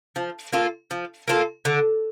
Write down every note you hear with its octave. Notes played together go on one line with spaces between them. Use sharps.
F3
A#3 F4 A4
F3
A#3 F4 A4
D3